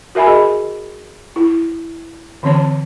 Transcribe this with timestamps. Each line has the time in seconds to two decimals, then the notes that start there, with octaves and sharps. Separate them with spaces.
0.15 F#4 A#4 E5 G#5 B5
0.27 G#4 D#5
1.36 E4
2.43 D3 E3 C4 C#5 A5